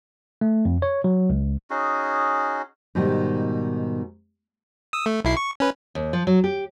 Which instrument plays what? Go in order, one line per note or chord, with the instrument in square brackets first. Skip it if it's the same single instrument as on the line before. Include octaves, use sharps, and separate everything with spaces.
[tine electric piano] A3
F2
C#5
F#3
C#2
[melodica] C#4 D#4 F#4 G#4
[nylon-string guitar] G#2 B2 D#3 G3
[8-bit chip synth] D#6 E6
A3
B1 E4 C7
C#6
C#4 B4
[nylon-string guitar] D#2
F3
F#3
G4